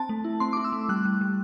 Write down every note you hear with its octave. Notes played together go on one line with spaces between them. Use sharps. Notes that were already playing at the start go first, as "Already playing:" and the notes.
Already playing: C4 A5
A3
E4
C4 C6
D6
E4
E6
A3
G3 F#6
G3
G3